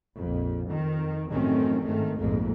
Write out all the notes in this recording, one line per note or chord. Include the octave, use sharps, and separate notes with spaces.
A#1 F2
F2 D#3
A1 F#2 D#3 A3 C4 C#4
G#2 D#3 A3
A#1 F2 G#2 A3 A#3